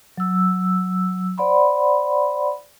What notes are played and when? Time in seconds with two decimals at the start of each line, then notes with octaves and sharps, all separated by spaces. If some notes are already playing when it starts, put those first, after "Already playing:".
0.18 F#3 E6
1.38 C5 D5 F#5 B5 C6